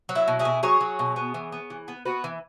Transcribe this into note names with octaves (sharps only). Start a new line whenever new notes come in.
F#3
E4
B2
E4 G#4
B2
F#3 G#4 C#5
F#3
B2
B3
E3
B3
E3
B3
B3 F#4 B4
E3